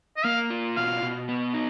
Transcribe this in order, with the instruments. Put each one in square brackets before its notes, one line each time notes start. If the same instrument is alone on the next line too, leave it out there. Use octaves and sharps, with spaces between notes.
[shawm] D#5
[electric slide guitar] A#3 [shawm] F5
[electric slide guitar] F4
[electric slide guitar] B2 [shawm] F5
[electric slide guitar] B2
B3
D#4